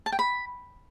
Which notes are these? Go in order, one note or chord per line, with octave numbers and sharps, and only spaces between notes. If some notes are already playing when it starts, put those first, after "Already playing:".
A5
G5
B5